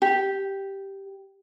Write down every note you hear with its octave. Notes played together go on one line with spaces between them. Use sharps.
G4